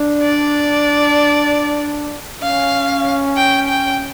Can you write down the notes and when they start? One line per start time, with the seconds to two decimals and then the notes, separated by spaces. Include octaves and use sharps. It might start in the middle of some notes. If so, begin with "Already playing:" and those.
Already playing: D4
0.23 D5
2.42 C#4 F5
3.37 G5
3.68 G5